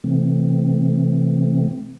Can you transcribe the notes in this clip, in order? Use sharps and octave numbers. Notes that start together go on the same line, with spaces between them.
C3 E3 A3 C4